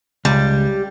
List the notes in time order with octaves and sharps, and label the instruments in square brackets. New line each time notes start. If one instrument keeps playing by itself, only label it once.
[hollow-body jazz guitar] C#2 [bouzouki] G3